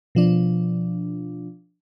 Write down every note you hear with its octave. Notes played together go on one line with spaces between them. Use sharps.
B2 F3 D4